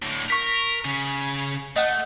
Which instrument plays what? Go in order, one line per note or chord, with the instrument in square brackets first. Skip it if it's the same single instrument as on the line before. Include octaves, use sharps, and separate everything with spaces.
[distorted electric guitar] A2 D3
[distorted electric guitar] A#4 [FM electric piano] C#6 B6
[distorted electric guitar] C#3
[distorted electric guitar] A3 [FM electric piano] D#5 F#5